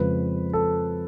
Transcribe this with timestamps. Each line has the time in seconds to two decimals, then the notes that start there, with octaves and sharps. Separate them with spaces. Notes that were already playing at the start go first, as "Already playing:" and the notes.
Already playing: F2 C#3 F3 G#3 B4
0.53 A4